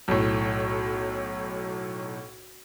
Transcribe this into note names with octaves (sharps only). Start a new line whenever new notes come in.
B1 A2